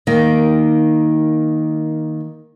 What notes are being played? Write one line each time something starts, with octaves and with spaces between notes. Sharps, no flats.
D#3 A#3